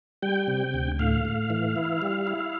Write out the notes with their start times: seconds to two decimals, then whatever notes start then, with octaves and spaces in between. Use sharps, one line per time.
0.23 G3 G5
0.48 C3
0.74 D2
0.99 A2 F5
1.25 A2
1.50 E3
1.76 E4
2.02 G3
2.27 E4